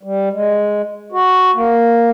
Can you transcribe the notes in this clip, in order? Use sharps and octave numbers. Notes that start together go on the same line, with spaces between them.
G3
G#3
F#4
A#3